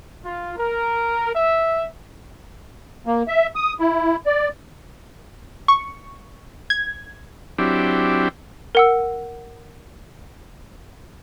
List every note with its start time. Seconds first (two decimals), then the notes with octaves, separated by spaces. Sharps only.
0.24 F4
0.56 A#4
1.35 E5
3.06 A#3
3.28 E5
3.56 D#6
3.80 E4
4.26 D5
5.68 C#6
6.70 G#6
7.59 F#3 C4 D4 E4 G4
8.75 A#4 F#5 E6